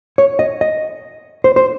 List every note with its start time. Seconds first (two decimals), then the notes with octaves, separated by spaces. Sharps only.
0.18 C#5
0.39 D#5
0.61 D#5
1.44 C5
1.56 C5